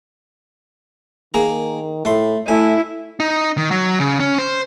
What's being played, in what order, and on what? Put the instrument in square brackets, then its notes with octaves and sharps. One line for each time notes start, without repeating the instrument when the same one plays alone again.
[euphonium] D#3 [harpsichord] A#3 G#4 A#5
[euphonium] A2 [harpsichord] A3 C6
[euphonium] A3 [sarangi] E4 [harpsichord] G#5
[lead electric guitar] D#4
D#3
F#3
C#3
C#4
C5